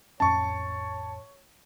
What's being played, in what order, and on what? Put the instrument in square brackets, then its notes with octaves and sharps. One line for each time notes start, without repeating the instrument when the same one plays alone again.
[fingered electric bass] A1 F2 C#4 [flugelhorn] C#5 [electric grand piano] A5 C#6